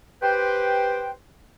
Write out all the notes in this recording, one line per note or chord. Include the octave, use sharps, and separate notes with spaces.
G4 B4 C5 G5